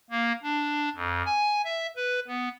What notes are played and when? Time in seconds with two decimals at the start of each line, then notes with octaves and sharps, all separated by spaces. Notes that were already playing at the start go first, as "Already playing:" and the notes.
0.10 A#3
0.43 D4
0.95 F2
1.26 G#5
1.65 E5
1.96 B4
2.27 B3